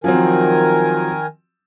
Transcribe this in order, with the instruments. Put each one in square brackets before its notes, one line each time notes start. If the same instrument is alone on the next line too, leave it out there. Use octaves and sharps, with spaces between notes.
[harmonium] D#3 A#4 G#5 [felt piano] F3 F#3 C4